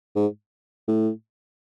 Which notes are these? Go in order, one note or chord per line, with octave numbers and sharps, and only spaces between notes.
G#2
A2